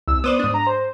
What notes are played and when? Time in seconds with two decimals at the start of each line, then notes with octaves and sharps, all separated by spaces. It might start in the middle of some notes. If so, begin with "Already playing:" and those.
0.08 C2 E6
0.24 B3 C5 D5 D#6
0.39 G#2 D4
0.54 A#5
0.67 C5